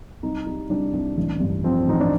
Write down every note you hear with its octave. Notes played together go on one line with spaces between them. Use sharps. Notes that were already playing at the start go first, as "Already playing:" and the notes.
C2 D#4
G3 D#4
C2 D4
C2
A1
G2
F3 C4
A1 D#4
D4